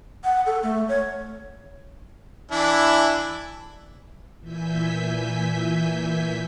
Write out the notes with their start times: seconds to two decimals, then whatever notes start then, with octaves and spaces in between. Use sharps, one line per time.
0.24 F#5
0.46 A4
0.63 A3
0.89 C#5
2.51 E3 D4 E4
4.40 A#2 E3 E5 G#5 G6 B6